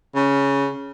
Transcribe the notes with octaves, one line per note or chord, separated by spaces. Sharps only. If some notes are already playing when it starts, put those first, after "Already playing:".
C#3